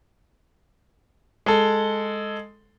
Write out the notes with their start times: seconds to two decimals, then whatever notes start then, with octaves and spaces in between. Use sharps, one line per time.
1.46 G#3 A4